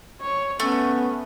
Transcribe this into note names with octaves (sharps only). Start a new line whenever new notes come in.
C#5
A3 B3 C#4